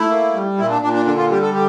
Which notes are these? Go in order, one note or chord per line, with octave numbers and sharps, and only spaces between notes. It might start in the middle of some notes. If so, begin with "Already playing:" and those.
Already playing: A3 E4
A#3
G3
A#2 E4
D4
A#2 D4
D4
D3 D4
F4
G3 G4
A4
D3 G4